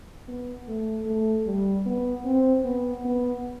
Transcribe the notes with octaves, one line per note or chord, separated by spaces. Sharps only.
B3
A3
A3
G3
B3
C4
B3
B3